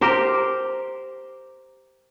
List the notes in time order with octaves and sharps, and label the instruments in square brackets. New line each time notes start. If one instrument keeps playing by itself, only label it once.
[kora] G4 A#4 C5